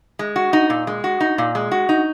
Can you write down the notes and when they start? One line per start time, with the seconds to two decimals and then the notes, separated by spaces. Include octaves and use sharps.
0.19 G#3
0.36 F#4
0.53 D#4
0.70 A#2
0.87 G#3
1.04 F#4
1.21 D#4
1.38 A#2
1.55 G#3
1.72 F#4
1.89 D#4